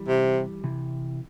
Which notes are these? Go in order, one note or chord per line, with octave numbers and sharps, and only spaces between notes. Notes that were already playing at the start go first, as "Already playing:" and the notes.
Already playing: E3 G3
C3
C3 E3